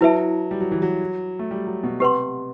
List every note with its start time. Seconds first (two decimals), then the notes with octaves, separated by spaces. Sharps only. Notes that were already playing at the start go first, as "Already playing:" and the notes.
0.01 F#3 E4 B4 E5 A5
0.51 G3
0.60 F#3
0.71 E3
0.82 F#3
1.39 A3
1.51 G3
1.67 F#3
1.83 B2
2.00 C3 G4 B4 F#5 C6